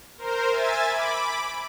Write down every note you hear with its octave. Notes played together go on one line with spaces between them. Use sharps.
A#4 C5
E5 G#5 A6
B5 D6